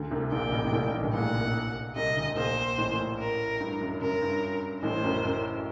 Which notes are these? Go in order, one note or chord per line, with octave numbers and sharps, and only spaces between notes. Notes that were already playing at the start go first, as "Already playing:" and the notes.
Already playing: D2 D3
C2 C3
A#1 A#2 G5
A1 A2
C3
A#1 A#2
A1 A2
G2
A1 A2
A#1 A#2 F#5
C2 C3
C2 C3 D#5
D2 D3
A#1 A#2 C5
A1 A2
A#4
G2
F#2
F#2 A#4
G2
A1 A2 C5
F#2
F#2